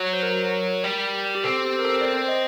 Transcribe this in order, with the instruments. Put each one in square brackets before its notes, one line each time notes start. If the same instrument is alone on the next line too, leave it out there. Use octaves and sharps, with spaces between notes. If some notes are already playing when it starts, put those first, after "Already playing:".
Already playing: [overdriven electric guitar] F#3
[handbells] C5
A#4
[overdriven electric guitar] G3
[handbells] G4
[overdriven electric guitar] C4 [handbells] A4
[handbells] G4
A#4
A4
D5
C5
D#5